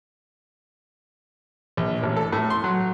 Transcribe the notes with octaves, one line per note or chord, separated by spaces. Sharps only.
A#1
A1
A4
A2
C6
F#3